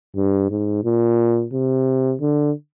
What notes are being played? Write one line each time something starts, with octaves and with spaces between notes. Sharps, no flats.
G2
G#2
A#2
C3
D3